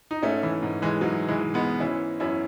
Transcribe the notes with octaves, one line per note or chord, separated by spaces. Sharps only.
D#4
G#2 A3 C#4
E3
G#2
E3 G#3
G#2 F#3
E3 G#3
E3
G#3 B3
E3 C#4 E4
F#2 C#4 E4